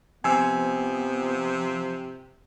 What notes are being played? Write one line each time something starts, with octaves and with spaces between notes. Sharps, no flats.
C3 F3 B3 G#5 E6